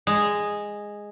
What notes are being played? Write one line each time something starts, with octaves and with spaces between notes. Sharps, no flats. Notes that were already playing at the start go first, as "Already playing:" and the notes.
G#3